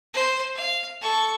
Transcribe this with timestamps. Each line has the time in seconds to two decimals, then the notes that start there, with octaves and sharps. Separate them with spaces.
0.14 C5
0.55 F5
1.01 A4 C#6